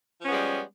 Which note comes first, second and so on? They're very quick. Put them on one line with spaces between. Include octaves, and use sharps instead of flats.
F3 C#4 B3 G#3 G3